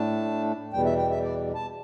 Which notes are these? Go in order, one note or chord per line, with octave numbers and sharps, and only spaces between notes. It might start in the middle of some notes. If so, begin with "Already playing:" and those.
Already playing: A2 A3 D4 A5
E2 B2 G3 G5
E5
G5
E5
D5
A5